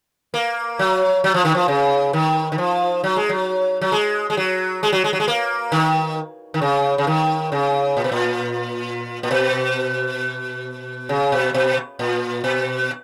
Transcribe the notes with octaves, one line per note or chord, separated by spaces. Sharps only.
A#3
F#3
F#3
F3
D#3
F3
C#3
D#3
D#3
F3
F#3
G#3
F#3
F#3
G#3
G#3
F#3
G#3
F#3
G#3
F#3
G#3
A#3
D#3
D#3
C#3
C#3
D#3
C#3
A#2
B2
A#2
A#2
B2
C#3
B2
B2
A#2
B2